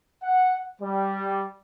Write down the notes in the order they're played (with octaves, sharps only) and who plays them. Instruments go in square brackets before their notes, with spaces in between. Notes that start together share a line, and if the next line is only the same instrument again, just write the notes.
[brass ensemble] F#5
G3